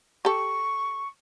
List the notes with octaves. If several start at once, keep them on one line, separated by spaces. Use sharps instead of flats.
G4 A4 C#6